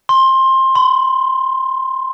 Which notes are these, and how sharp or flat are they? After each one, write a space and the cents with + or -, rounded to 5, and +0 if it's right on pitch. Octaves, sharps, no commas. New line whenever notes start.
C6 +20
C6 -40